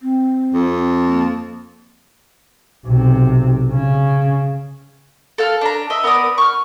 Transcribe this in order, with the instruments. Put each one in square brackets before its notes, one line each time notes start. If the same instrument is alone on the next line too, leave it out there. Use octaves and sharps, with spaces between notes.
[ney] C4
[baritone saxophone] F2
[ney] A#3
[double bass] B1 C3
C#3
[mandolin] A4 F5 F6
D4 A#5
D#5 E5
B3 A#4 D5 D#6
C#6 F6